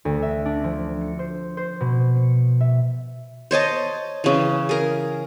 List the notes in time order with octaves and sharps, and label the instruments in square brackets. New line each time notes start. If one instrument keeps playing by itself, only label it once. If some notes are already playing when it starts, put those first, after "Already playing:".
[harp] D2
E5
D4
F3
C#7
C5
C5
B2
C#7
E5
[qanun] C5 C#5 D#5 A5
C#3 E3
G#4 A#4